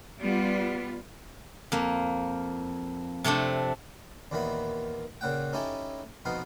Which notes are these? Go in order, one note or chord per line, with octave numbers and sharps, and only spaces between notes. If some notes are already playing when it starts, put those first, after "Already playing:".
G3 B3 F4 B4
F2 A#3
C3 A3 C4 D4
D#2 A#2 D#3 E3 B3 B5
A#2 C#3 F#5 G5
C#4 D#4 E4 G4 A4 G#5
F2 B2 B3 D#4 F5